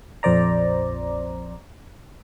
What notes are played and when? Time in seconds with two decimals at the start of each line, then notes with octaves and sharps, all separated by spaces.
0.23 A#1 F2 C5 D5 A#5